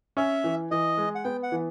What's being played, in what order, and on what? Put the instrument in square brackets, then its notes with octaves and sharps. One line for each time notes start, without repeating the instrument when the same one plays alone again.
[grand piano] C#4 [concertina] E5
[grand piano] E3
[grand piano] E3 [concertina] D#5
[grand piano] G#3
[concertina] F#5
[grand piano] B3 [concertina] G5
[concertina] F#5
[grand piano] E3